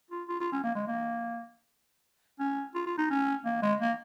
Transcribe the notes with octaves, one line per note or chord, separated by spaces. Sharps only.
F4
F4
F4
C#4
A#3
G#3
A#3
C#4
F4
F4
D#4
C#4
A#3
G#3
A#3